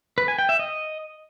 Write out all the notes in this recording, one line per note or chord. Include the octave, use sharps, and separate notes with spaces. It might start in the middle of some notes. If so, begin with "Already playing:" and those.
B4
G#5
G5
E5
D#5